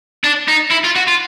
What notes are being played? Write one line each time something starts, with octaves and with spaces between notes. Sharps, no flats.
D4
D#4
E4
F4
F#4
F4